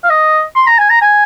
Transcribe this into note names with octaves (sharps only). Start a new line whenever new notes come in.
F5
D#5
C6
A#5
G#5
A#5
G#5